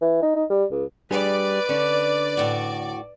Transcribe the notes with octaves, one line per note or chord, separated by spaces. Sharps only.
E3
D#4
D#4
G3
C#2
G3 D4 G#4 B4 D5
D3 C#4 D4
D2 A2 F#4